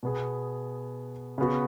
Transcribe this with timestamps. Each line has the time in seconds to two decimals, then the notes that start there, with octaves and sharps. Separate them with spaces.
0.03 B2 B3 G#4
1.38 C#3 B3 F#4